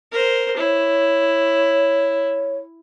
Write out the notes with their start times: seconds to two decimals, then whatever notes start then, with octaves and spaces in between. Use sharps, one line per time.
0.12 A#4 C5
0.57 E4 C#5